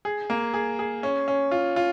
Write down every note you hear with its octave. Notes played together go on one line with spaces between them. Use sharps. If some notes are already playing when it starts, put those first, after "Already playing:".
G#4
A#3
G#4
G#4
C#4
C#4
F4
F4